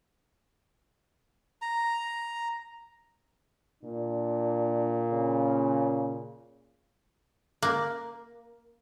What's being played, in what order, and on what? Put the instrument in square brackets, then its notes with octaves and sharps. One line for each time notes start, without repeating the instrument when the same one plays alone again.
[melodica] A#5
[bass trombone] A#2 [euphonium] D4
[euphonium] C#3
[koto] A#3